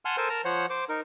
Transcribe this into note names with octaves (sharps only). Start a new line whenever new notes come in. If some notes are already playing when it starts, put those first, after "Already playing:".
F#5 G#5 A5 C6 F6
A4 A#4 C5 G#5 A5
A#4 A5 A#5
F3 C5 C#5 F#5
C5 D6
D#4 A#4